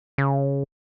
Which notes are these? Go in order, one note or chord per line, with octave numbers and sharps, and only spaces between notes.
C#3